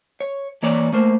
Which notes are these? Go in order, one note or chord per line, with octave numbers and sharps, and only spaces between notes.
C#5
E3 A#3 C#5 D5
A3 A#3 C5